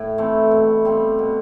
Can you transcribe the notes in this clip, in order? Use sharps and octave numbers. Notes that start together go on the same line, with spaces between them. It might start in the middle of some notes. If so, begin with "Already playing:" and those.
Already playing: A2
E3 A3 C4
B2
G3 C4 F4
B2